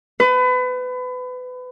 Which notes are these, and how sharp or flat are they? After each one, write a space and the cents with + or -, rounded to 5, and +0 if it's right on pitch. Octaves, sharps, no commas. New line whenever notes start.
B4 +30